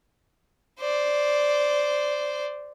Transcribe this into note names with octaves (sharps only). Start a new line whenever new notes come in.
C5 D5